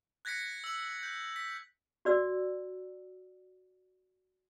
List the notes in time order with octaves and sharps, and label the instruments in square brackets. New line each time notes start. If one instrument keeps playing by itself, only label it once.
[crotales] F#6 G#6 A#6 B6 C#7
E6 F#7
G6
B6
[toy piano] F#4 D5 E6